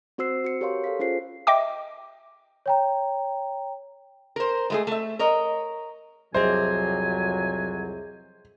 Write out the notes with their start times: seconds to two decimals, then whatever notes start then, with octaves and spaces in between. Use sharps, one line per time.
0.18 C4 F#4 C5 E6 C7
0.44 F#4 C#7
0.61 G4 A#4 B4 C#5 F5 C6
0.84 A4 F5 B6
0.99 C#4 F4 G#4 C5 C7
1.47 D#5 E5 G5 D6
2.66 C#5 G5 A#5
4.36 A#4 C5
4.70 G#3 A3 G#4
4.87 A3 E5
5.19 A#4 C#5 D#5
6.35 C2 F2 F#3 G#4 C5 D#5 E5 G#5